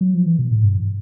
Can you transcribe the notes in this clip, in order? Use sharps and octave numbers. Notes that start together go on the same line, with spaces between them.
F#3
F3
E3
B2
A2
G2